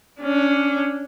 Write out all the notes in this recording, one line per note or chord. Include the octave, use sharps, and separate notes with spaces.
C#4 D4